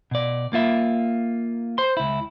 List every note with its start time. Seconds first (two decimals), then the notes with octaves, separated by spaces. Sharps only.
0.11 B2 D5
0.53 A#3 F4 E5
1.78 C5 C6
1.97 C#2 E4